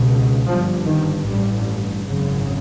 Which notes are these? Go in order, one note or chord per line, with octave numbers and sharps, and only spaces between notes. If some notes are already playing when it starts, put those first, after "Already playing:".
Already playing: C#2 B2
G1 G2 F3
D#3
A1 G2 G3
G#1 F#2 C#3